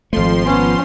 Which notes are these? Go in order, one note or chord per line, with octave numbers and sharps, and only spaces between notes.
G#1 F2 F3 A3 C6
B3 C#4